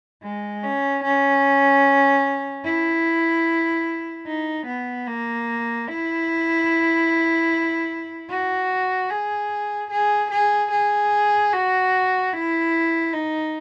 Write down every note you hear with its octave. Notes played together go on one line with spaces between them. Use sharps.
G#3
C#4
C#4
E4
D#4
B3
A#3
E4
F#4
G#4
G#4
G#4
G#4
F#4
E4
D#4